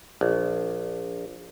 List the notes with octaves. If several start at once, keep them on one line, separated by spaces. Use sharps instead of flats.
A#1